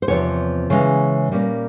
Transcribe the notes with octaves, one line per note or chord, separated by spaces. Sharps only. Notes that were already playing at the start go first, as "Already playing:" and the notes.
C5
E2 C3 F3 C#5
C#3 E3 G#3 C#4
A#2 G3 A#3 C#4